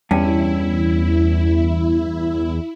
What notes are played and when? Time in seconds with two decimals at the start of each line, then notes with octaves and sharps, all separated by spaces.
0.11 E2 G2 C#4 E4